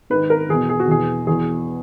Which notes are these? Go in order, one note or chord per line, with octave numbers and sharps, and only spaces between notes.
G#2 D#3 B4
A#4
E2 B2 G#4
G#4
F#4
E2 B2 G#4
E2 B2 G#4